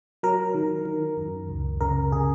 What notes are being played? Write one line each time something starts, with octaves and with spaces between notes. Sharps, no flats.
F#3 A#4
D#3
D#3
F#2
C#2
C#3 A#4
C#3 G#4